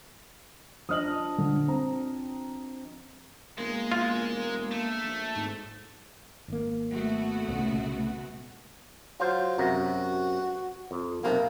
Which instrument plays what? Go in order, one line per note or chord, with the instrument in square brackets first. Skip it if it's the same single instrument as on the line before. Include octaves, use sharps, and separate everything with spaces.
[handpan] F3 D4 D#5 [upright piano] D#6 F6 F#7
[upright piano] D3
[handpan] C4 [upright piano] A#5
[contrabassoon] E1 [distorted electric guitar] G#3 [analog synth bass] A#3
[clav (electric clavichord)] F4
[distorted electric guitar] A3
[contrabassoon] A#1
[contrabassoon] G#1 [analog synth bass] G#2
[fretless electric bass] G#1 A#3
[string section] A3 B3 F#4
[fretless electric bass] C2 A#2 C#3
[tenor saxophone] F#3 [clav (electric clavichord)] F4 C5
[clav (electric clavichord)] F#2 C3 A#5 [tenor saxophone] F#4
[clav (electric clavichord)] F2
[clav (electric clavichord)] B1 C3 [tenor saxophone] A#3